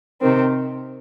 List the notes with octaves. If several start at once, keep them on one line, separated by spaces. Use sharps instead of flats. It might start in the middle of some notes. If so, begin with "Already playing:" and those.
C3 D#3 C4